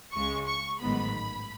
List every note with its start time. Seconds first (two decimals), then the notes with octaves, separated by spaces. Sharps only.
0.14 C#2 C#3 G#3 C#6
0.47 C#6
0.81 A1 G#2 D#3 F#3 B3 B5